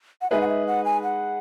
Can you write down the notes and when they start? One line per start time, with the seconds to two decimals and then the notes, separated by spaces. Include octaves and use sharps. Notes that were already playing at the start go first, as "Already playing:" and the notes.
0.21 F#5
0.31 G#3 D#4 G#4 B4 E5
0.41 F#5
0.48 E5
0.67 F#5
0.85 G#5
1.03 F#5